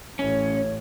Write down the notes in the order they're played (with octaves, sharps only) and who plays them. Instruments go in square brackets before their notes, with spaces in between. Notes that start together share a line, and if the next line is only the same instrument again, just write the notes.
[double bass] A1 [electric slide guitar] C#4 [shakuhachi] C#5